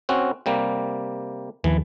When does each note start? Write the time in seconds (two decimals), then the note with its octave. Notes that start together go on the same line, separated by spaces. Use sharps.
0.09 C4 C#4 F#4
0.46 C3 G3 A#3
1.64 D#2 E3 F3